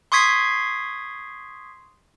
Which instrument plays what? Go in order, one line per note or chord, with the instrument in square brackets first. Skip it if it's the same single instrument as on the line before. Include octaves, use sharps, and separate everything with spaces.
[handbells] C6 C#6 D#6 G#6 B6 C7